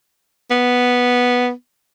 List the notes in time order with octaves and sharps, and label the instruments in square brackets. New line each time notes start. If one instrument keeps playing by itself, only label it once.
[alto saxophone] B3